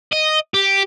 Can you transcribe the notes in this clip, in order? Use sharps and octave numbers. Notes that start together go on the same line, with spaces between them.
D#5
G4